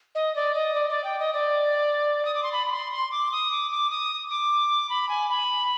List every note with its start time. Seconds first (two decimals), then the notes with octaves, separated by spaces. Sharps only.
0.15 D#5
0.36 D5
0.55 D#5
0.74 D5
0.89 D5
1.04 G5
1.19 D#5
1.34 D5
2.25 D#6
2.35 D6
2.43 C6
2.52 B5
2.66 B5
2.72 C6
2.93 C6
3.11 D6
3.32 D#6
3.51 D6
3.71 D6
3.91 D#6
4.30 D6
4.89 B5
5.09 G#5
5.29 B5